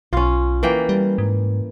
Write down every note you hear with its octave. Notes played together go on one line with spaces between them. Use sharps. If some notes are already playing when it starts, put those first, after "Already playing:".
B1 C#4 F4
E3 A#3 G5
G3
G#2